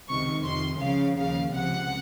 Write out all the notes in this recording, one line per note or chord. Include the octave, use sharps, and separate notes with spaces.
C#2 C3 D#3 C#6
F2 C3 D#3 C6
C#2 C#3 F3 F5
D#2 C#3 F3 F5
C#2 C3 F3 F#5